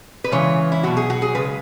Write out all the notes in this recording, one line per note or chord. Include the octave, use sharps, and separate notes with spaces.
B4
C#3 E3 G#3 C#5
E4
B2 F#3 F#4
G#4
F#4
G#4
C#3 G#3 B4